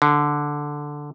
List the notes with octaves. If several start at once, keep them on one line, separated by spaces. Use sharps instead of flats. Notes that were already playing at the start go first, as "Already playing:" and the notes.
D3